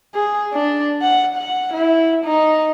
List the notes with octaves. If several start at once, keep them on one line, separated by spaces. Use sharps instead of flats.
G#4
D4
F#5
F#5
E4
D#4